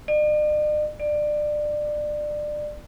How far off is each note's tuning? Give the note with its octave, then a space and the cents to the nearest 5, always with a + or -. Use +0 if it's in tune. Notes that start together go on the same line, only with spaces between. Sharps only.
D5 +45
D5 +25